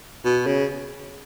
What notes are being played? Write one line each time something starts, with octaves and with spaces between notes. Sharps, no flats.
B2
C#3